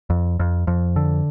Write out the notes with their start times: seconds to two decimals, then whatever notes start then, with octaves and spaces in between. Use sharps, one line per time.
0.10 F2
0.39 F2
0.67 F2
0.96 D3